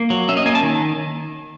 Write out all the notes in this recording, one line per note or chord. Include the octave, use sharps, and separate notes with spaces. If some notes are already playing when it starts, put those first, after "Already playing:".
Already playing: A#3
F#3
C#4 E5
D#5
A#3 G#5
A5
D#3